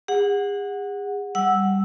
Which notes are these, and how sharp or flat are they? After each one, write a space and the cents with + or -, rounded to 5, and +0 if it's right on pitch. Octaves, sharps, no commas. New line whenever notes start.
G#4 -40 F#5 -10
G3 +0 F#5 +0 E6 -5